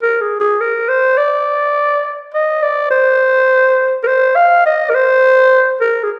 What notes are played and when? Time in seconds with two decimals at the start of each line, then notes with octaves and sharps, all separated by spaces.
0.02 A#4
0.21 G#4
0.40 G#4
0.60 A#4
0.89 C5
1.18 D5
2.34 D#5
2.63 D5
2.91 C5
4.03 A#4
4.07 C5
4.36 F5
4.66 D#5
4.90 A#4
4.95 C5
5.81 A#4
6.03 G#4